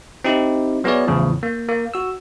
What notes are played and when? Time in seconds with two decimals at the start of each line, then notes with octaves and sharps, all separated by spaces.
0.24 C4 D#4 E4 G4
0.84 F#3 B3 E4 G#4 C#5 D5
1.08 E2 A2 C#3 F3
1.43 A#3
1.69 A#3
1.94 F#4 E6